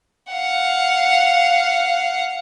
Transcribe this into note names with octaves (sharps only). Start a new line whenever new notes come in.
F5 F#5